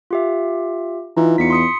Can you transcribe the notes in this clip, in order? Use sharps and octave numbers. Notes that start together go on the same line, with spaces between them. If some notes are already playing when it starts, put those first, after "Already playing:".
F4 G4 E5
E3 D#4 F4 A#5
E2 B6 C#7
C6 D#6 C#7